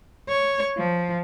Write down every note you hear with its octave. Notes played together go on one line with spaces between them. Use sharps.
C#5
F3